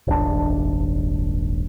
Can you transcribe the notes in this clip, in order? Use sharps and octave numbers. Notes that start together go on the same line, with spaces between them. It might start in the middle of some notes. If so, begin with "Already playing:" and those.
D#1 G#1 D4